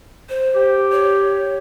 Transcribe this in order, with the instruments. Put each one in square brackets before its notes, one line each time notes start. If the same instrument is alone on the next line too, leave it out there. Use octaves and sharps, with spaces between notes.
[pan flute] C5
[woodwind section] G4
[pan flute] C#5